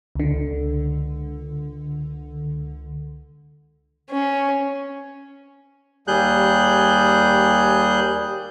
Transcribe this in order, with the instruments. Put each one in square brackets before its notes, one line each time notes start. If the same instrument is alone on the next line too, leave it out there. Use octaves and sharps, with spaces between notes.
[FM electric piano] C#2 D3
[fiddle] C#4
[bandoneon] D#2 G3 G#4 F#6 G6